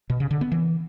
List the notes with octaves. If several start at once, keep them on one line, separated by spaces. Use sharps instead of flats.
B2
C#3
D3
B3
E3